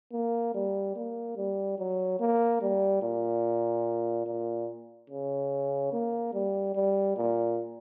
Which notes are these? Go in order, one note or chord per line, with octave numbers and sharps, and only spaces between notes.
A#3
G3
A#3
G3
F#3
A#3
G3
A#2
A#2
C#3
A#3
G3
G3
A#2